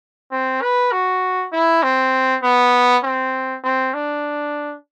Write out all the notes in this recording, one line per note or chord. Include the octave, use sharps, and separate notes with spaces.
C4
B4
F#4
E4
C4
B3
C4
C4
D4